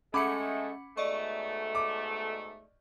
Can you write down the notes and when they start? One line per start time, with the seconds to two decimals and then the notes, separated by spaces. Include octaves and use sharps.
0.14 G#3 A3 C#4 F#5 B5 D6 C#7
0.97 G#2 B2 A3 D5 D#5 C#6
1.75 D6